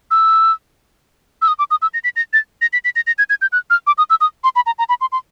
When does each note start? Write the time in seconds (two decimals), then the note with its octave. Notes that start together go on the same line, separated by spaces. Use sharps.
0.11 E6
1.42 E6
1.48 D#6
1.59 D6
1.71 D#6
1.82 E6
1.94 A#6
2.04 B6
2.16 A#6
2.33 A6
2.62 A#6
2.73 B6
2.85 B6
2.96 A#6
3.07 A#6
3.18 G#6
3.30 G#6
3.42 G6
3.52 F#6
3.70 F6
3.87 D6
3.98 D#6
4.10 E6
4.21 D#6
4.44 C6
4.56 B5
4.66 A#5
4.79 A#5
4.89 B5
5.01 C6
5.12 C6